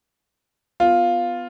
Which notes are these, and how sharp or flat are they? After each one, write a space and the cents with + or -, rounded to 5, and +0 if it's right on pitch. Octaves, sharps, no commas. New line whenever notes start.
B3 +20 F4 +5